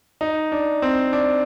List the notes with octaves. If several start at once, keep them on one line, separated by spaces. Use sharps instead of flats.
D#4
D4
C4
D4